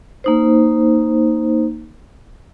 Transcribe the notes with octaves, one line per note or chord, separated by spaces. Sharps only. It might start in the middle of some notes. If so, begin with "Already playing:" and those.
A#3 D#4 C5